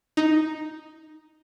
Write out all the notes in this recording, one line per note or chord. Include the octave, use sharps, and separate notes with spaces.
D#4